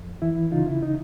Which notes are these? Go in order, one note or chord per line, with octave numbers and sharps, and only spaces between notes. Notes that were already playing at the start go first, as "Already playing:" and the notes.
Already playing: F2
E3 E4
C#3 D#4 F4
E4
D#4